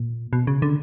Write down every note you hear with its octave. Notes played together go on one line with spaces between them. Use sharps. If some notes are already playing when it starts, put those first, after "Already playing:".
Already playing: A#2
B2
C#3
D3